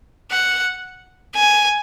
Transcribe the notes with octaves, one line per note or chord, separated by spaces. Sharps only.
F#5
G#5